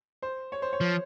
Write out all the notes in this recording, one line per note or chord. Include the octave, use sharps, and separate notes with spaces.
C5
C#5
C5
C#5
F3